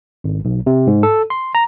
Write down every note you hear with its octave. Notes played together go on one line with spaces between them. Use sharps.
G#1
B1
C3
G#2
A4
C6
A#5